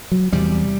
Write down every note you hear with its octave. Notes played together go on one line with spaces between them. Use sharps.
F#3
E2 C3 G3